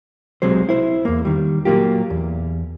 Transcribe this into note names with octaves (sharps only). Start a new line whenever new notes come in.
B1 C3 F#3 G#3 C5
E4 C5
E2 A#3
D#3 G3
A#2 F#3 A#3 F4 G4
E2